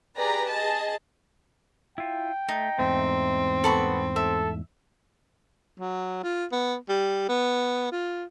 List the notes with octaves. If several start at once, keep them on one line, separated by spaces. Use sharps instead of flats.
G4 G#4 B4 D5 A#5
G#4 D#5 A5
E4 F4 G5
A3 D#4
E2 G#2 A3 C4
B3 A4 B5 C#6
A4 E5
F#3
F4
B3
G3
B3
F4